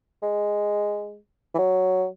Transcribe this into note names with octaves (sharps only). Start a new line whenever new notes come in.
G#3
E3
F#3